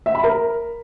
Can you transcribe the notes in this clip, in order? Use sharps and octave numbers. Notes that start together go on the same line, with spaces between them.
E5
B5
A#4